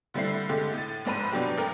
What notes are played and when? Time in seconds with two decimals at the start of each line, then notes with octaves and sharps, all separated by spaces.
0.14 D3 G3 A3 C4 E4 C7
0.49 D3 G#3 A3 G4
0.73 A2 A6
1.05 F1 G#2 C5 B5 D#7
1.32 B2 F#3 D4 G4
1.58 A1 A#4 G5